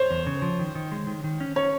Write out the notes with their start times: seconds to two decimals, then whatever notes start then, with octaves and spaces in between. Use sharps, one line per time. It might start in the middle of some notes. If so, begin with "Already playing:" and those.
Already playing: C5 C#5
0.11 E2
0.27 C#3
0.42 F3
0.59 D#3
0.75 D#3
0.92 G#3
1.07 D#3
1.24 D#3
1.40 C#4
1.56 C#4 C#5